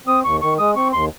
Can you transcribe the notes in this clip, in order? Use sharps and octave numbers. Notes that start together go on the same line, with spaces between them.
C4 D#6
D#2 C#6
D#3 C#6
G#3 D#6
C4 C#6
D#2 C6